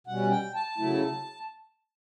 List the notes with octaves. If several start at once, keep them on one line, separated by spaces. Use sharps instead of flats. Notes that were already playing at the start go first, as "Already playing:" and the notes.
B2 G3 C#4 F#5
G5
A5
C#3 F#3 A3 E4